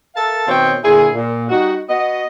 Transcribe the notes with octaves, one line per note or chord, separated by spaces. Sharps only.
A4 A#4 E5 F5 A5
B2 D#3 C4 C#5 G5
A#2 D3 E4 G#4
A#2
G3 D#4 F#4
B3 F#4 D#5